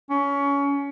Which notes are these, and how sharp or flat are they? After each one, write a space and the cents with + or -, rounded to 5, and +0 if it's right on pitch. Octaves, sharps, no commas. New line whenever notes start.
C#4 +20